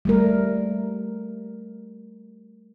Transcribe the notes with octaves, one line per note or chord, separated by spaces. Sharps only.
G3 A3 A#4